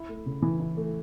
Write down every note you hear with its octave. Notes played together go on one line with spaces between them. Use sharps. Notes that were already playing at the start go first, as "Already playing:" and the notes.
Already playing: E4
A3
C#3
E3
E4
A3